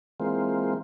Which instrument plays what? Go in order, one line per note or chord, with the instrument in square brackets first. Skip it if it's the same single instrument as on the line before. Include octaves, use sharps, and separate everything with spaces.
[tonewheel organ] E3 G#3 A#3 C4 F4